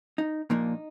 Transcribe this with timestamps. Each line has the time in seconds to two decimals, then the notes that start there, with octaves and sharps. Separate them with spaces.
0.18 D#4
0.50 A#2 F3 A#3 D4 D#4